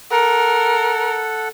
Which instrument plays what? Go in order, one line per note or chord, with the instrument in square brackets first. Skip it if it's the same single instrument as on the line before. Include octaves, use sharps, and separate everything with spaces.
[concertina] A4 F#5 [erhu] A#4